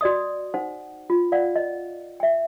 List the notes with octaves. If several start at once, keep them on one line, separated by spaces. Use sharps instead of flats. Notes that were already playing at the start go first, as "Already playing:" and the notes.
F#4 D5 D#5 D#6
D#4 C5 F#5
F4
D5 F5 F#5
D#5
E5 G5